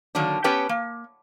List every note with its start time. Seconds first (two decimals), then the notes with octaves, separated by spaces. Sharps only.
0.15 D3 D#3 F#3 A#3 D4
0.44 B3 C#4 G4 B4 G5 A5
0.69 A#3